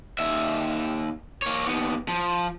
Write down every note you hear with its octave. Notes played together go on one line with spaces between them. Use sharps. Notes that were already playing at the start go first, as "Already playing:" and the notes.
D#2 E5
A#3 C#5
D#2 B3
F3